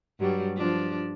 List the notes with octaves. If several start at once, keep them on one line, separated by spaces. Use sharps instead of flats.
G2 F#3 G3
F3 D4